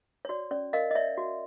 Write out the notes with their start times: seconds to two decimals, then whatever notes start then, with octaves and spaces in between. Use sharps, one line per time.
0.25 C#5
0.29 F#4 D5
0.51 C#4 D5
0.73 A#4 D#5 F5
0.91 D#5
0.95 C#5 D5 E5
1.18 F#4